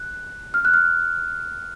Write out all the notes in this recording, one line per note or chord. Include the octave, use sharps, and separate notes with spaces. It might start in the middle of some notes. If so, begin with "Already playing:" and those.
Already playing: F#6
F6
F#6
F6